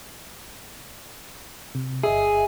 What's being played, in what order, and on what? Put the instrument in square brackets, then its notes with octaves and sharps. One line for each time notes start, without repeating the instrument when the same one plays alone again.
[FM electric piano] C3
[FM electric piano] G1 D#5 E5 [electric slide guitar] G#4